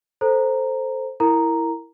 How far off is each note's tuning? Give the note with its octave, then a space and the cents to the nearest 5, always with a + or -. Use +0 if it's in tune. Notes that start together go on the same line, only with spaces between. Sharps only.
A4 +5 C5 +0 A#5 -5
E4 +0 A#4 -15 A#5 +0